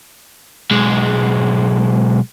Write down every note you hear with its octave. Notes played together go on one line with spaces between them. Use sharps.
B1 G#3